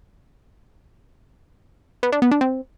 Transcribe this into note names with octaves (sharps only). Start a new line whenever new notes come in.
B3
D4
B3
D4
C4